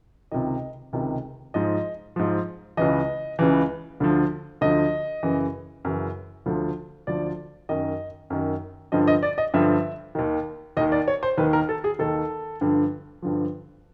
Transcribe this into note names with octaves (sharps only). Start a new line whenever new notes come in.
C#2 C3 D#3 D#5
C#2 C3 D#3
G#2 F3 D#5
G#2 F3
C#2 C#3 E3 D#5
C#2 C#3 E3
D2 D3 F3
D2 D3 F3 D#5
F#2 C#3 E3
F#2 C#3 E3
D2 D3 F3
D2 D3 F3 D5
F#2 D#3 D#5
F#2 D#3
G2 D3 F3 D#5
D#5
D5
D#5
G2 D3 F3 E5
D#2 D#3
D#2 D#3 D#5
D5
C#5
C5
D#2 D#3 B4
A#4
A4
G#4
D#2 D#3 A4
G2 D3 F3
G2 D3 F3